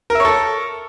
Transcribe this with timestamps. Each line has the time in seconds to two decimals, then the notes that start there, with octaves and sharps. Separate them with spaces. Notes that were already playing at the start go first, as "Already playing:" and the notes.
0.10 A#4
0.15 E5
0.20 C#5
0.25 A4